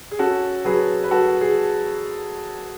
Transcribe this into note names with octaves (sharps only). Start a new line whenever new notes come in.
G#4
C#4 F#4 A4
F#3 G#4 B4
B4
F#3 F#4 A4
G#4